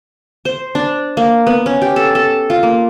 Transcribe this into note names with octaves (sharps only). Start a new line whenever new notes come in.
C5
D4
A#3
B3
C#4
G4
A4
A4
F4
A#3